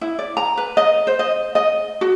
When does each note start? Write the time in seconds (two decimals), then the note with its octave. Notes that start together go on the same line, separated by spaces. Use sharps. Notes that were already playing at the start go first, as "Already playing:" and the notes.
0.01 E4
0.19 D5
0.37 A#5
0.57 B4
0.77 D#5
1.07 C5
1.19 D#5
1.55 D#5
2.01 F#4